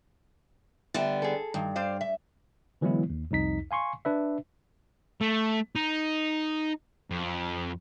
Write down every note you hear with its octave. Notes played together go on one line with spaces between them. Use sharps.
D3 G3 B3 E5
G#4 A4
G2 D#3
C5 D5 F5
E5
D3 E3 F#3 G#3 B3 E4
D#2
C2 F2 D#4 B6
F5 G#5 C6 C#6
D4 B4 E5
A3
D#4
F2